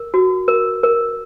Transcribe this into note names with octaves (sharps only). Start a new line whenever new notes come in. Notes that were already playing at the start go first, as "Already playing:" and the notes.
Already playing: A#4
F#4
A#4
A#4